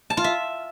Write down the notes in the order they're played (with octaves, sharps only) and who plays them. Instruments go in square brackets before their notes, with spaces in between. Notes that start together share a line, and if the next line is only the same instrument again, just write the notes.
[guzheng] A5
F4
E5